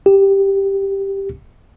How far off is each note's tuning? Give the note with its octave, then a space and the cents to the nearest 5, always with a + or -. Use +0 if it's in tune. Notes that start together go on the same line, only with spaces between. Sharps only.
G4 +0